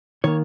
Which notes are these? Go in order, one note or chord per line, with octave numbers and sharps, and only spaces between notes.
D#3 A#3 C#5